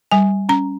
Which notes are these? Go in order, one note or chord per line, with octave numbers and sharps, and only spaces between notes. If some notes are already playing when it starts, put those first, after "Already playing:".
G3 G#5
C#4 A#5